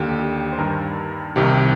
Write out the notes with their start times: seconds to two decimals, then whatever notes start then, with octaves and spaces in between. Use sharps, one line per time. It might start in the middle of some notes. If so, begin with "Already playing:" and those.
Already playing: D#2 D3 G4
0.20 G4
0.52 C5
0.58 G2 D#3 A#4
1.36 C2 C3 D#3 G4